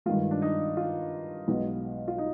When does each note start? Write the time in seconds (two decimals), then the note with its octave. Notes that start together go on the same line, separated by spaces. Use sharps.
0.06 G2 D#3 G#3 F4
0.31 D4
0.42 D#4
0.77 F4
1.48 B1 B2 G#3 B3
2.08 F4
2.18 D#4